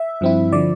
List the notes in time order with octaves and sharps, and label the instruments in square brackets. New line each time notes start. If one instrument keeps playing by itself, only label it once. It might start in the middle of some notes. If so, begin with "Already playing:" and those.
Already playing: [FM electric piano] E5
G2 F3 C4 E4
D3 F3 D5